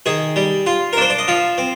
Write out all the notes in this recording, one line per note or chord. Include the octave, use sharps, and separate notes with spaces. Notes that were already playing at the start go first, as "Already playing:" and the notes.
D#3 G#4
G3
F4
A#4
D4 C5
D5
D#5
F3 F5
C4